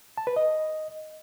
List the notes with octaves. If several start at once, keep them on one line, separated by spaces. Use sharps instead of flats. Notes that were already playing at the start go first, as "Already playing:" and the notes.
A5
B4
D#5